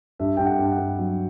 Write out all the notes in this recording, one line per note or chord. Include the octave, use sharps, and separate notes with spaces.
G2 E5
G2 G5
F#5
G2
F#5
G2
F#3